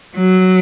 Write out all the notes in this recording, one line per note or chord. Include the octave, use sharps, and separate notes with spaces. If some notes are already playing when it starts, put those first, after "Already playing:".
F#3